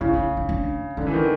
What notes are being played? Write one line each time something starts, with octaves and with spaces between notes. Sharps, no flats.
C#3 E4
D#4
D#4
D4
D3 C#4
E3
D#3